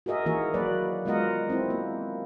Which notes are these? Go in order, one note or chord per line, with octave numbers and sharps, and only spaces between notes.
F#4 G#4 A#4 D#5 E5
D#3 E3 A#3 F#4 G#4 A#4
F#3 A#3 B4 D5
G#3 B3 F4 A#4 D#5 F#5
C4 E4
A#3